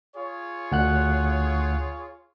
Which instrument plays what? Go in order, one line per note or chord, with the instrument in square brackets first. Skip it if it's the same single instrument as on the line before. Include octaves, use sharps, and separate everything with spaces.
[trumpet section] F4 G#4 C#5
[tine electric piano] D2 F#5 F#6